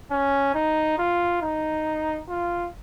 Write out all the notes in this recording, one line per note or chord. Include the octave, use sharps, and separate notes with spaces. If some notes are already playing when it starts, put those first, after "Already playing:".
C#4
D#4
F4
D#4
F4